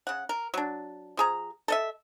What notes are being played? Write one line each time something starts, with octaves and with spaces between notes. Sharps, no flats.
C#3 F#5
A#4
F#3 D4
F3 G#4 A#5
A4 D#5 E5